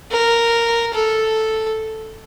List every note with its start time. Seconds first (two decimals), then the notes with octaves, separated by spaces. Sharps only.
0.11 A#4
0.94 A4